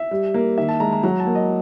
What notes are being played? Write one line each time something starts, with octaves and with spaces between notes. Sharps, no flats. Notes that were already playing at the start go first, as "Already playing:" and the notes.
Already playing: E5
G3
A#3
D#3 E5
A5
G#3 A#5
A#5
F#3 A#5
A5
A#3
D#5